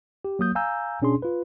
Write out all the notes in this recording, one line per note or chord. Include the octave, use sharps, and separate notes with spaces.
G4
F#3 A#3 D#6 G6
F5 G#5 A#5 E6 G6
B2 C#4 D4 G#4 C6
F4 B4